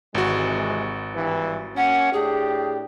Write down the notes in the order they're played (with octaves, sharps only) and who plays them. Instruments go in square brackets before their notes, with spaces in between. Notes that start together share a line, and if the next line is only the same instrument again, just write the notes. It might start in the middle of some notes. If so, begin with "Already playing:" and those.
[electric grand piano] G#1 F#4 [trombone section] C3 E3 G#3
[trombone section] G2 E3
[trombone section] A#3 C#4 [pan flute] F#5
[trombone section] A2 D4 G4 [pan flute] G#4